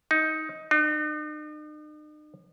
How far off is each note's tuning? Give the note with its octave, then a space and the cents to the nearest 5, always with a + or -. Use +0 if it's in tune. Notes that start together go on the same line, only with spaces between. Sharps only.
D#4 +15
D#4 -45